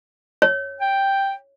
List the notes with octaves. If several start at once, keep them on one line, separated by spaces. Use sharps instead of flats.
C#5
G5